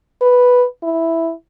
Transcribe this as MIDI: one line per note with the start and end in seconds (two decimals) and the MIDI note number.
0.21 0.65 71
0.83 1.32 64